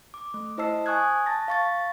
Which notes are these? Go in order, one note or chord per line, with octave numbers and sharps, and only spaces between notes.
D6
A3
E4 C5 D#5 A5 E6 C7
G#5 C#6 D#6 F#6 G#6
A5 A6 A#6
F5 C#6 A6